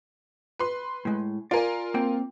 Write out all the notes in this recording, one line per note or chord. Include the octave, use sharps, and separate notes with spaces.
B4 C6
A2 G#3
F4 A#4 D5 G#5
A#3 C4 G5